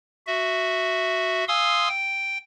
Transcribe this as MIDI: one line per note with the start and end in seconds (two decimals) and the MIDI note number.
0.27 1.44 66
0.27 1.44 76
1.48 1.89 77
1.48 1.89 80
1.48 1.89 84
1.48 1.89 87
1.48 1.89 88
1.89 2.38 79